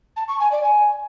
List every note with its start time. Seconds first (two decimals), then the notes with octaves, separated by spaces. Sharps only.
0.17 A5
0.28 C#6
0.40 G#5
0.52 D5
0.63 G#5